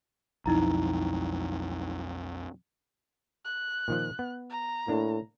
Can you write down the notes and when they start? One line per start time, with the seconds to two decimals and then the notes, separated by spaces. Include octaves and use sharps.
0.46 B1 F2 D#4 E4 A#5
3.45 F#6
3.88 A#2 D#3 F3
4.19 B3
4.50 A#5
4.88 A2 A#3 D4